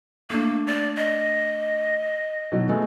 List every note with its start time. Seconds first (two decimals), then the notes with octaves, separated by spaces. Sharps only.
0.30 A3 A#3 D4
0.67 D5
0.97 D#5
2.52 B2 D#3 F#3
2.69 G#3 A3 B3